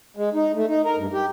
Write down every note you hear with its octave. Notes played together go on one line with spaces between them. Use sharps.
G#3
D#4
A3
D#4
A#4
G2
G4